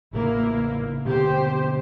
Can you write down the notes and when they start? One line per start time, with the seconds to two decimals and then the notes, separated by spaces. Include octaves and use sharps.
0.13 A1 C#3 A#3 E4 A#4
1.05 B2 D3 B3 G4 C5